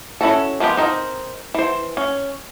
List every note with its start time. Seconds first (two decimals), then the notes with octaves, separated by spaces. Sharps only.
0.21 C#4 E4 F#4 A4
0.60 F3 G#3 B3 G4
0.77 C4 D#4 A#4
1.54 E3 C5
1.97 C#4